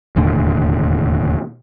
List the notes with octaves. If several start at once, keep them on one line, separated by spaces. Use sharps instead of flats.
E1 D#2 A2 D3